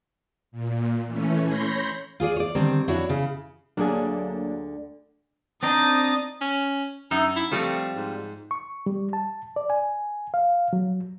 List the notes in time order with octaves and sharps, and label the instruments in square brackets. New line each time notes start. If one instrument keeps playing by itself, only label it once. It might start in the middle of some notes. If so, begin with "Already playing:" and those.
[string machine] A#2
E3 A3 C#4
C#5 B5 C6 G6 A#6
[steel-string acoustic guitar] F4 G#4 C#5 D5
C#5 D5
D3 D#3 G3 C4
F2 D4 E4 F#4 C#5
C#3
[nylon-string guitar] D2 D3 G#4 [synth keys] F#3 A#3 D4
[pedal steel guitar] C4 D4 D#4 [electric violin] D#6 A6
[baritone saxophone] C#4
[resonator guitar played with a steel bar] F#2 [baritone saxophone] D#4
[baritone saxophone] E4
[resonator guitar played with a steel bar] F3 G3 C4 [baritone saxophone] A3
[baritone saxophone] G#2
[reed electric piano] C#6
G3
A5
D5
G#5
F5
F#3